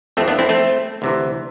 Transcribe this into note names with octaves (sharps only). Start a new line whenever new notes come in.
F2 E3 A3 C4
B3 D4
C4 E4
A3 C4
D2 C3 E3